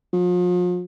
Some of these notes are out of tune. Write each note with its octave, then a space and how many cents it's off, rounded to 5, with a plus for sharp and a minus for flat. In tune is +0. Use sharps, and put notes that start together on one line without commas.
F3 +40